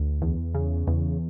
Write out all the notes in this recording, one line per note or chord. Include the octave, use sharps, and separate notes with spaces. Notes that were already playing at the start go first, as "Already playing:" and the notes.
Already playing: D2
E2
C#3
E2